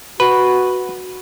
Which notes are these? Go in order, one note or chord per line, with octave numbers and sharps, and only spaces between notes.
F#4 B4